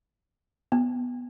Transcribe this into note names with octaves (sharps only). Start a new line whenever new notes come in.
B3